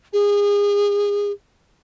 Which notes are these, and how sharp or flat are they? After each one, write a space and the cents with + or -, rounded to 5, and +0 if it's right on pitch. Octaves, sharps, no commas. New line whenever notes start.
G#4 -30